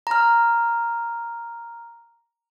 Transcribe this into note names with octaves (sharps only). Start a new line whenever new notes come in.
A#5 F6